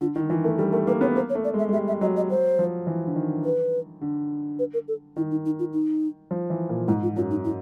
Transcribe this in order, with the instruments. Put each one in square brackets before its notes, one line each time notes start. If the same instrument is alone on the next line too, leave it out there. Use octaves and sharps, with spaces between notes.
[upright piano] D3 [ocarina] F4
[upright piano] D#3 [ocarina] E4
[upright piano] E3 [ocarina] F4
[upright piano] A3 [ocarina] A#4
[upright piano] G3 [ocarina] A4
[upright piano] A3 [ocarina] A#4
[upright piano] A#3 [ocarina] B4
[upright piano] B3 [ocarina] C#5
[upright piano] A#3 [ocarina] C5
[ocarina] C#5
[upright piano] A3
[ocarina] D5
[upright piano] G#3
[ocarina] E5
[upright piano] G#3
[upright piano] G3 [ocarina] E5
[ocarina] E5
[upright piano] F#3 [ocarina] D#5
[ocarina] D#5
[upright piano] F#3 [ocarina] C5
[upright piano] F3
E3
D3
D#3
[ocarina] B4
[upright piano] D3
[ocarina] B4
A#4
A4
[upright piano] D#3 [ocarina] E4
[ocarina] D#4
D#4
F4
D#4
[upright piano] F3
E3
A#2
[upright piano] G#2 [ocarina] E4
[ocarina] F4
[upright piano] F#2 [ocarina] F4
[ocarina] D#4
E4